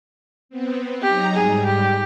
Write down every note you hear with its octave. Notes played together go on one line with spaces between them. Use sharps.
B3 C4
F#3 D#4 G4 A#5
G#2 G3 G#4
G4